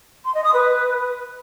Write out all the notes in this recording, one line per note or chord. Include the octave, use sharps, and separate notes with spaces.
C6
D#5
D#6
B4